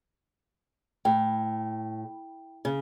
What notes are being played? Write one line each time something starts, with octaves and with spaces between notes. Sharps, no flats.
A2 G5
C#3